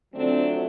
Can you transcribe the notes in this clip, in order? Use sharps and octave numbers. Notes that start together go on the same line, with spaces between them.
F2 D3 F#3 A3 C4 D4